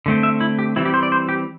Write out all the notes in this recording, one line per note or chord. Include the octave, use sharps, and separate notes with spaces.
D3 A3 C4
E5
E4
G4
E3 G3 C4 E4
G4
C5
D5
C5
G4